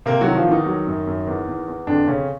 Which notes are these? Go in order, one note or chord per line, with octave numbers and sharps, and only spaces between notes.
C3 A#3 A#4
F#3 F#4
D#3
F3 F4
E2
D#3 D#4
F#3
F#2
F#2
E2
E2
E2
F2 D3 D4
F2 C#3 C#4